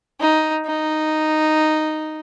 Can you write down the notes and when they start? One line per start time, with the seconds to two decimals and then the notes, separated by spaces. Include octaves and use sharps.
0.21 D#4
0.66 D#4